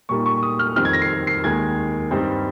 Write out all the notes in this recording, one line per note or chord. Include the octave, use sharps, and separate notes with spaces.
A#2 G3 A#3 D#4 C#6
C#6
D#6
F6
F2 D#3 G3 C4 F6
G#6
A#6
C7
C7
D#2 D#3 G#3 G#6
G2 G3 C4 D#4